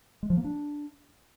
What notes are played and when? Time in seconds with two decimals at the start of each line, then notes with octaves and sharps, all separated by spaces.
0.23 G#3
0.30 F3
0.37 A#3
0.44 D4